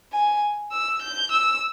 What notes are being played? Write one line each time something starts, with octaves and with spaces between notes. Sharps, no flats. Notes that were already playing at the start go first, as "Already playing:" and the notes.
G#5
E6
G6
E6